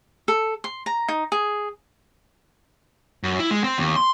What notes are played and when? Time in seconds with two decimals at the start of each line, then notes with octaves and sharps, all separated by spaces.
0.28 A4
0.64 C6
0.86 A#5
1.08 D#4
1.32 G#4
3.23 F#2
3.39 E4
3.51 G#3
3.64 C4
3.78 D#2
3.96 C6